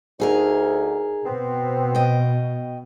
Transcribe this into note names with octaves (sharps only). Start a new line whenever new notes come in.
D2 D#4 G#4 A#4
B2 B3 C4
D#5 G5